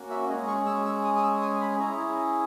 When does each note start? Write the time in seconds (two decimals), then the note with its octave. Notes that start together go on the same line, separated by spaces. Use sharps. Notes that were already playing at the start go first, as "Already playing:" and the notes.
Already playing: A#3 C#4 F#4
0.10 E5
0.29 G#3 C#4 G#4 D#5
0.48 C#6
0.66 E6
0.85 E6
1.05 D#6
1.16 D#6
1.23 E6
1.42 D#6
1.61 B5
1.79 C#4 E4 G#4 A#5